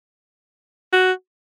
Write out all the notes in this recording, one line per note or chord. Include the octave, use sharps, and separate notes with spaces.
F#4